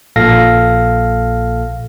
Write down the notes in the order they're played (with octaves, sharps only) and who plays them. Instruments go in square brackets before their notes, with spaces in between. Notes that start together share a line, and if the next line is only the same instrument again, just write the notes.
[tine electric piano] A#1 A#2 A4 F5 A#6